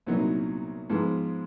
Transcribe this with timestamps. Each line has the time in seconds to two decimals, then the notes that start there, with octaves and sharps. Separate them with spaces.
0.07 C2 A#2 F#3 B3 D#4
0.90 G#2 F3 G#3 B3